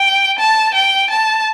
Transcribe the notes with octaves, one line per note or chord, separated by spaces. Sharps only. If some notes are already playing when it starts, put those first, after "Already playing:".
Already playing: G5
A5
G5
A5